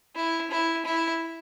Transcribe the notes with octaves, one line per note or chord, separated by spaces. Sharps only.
E4
E4
E4